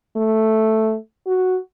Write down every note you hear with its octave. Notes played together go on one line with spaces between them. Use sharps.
A3
F#4